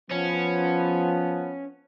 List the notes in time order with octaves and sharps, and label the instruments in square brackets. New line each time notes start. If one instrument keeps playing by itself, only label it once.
[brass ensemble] F3 B3 [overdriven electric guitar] C#4